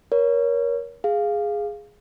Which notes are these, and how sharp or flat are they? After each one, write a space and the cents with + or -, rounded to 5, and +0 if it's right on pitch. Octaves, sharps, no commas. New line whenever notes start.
A#4 +30 C#5 +20
G#4 +0 F5 +0